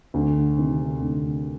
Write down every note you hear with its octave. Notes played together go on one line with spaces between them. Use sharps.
D2
C3 D#3
D2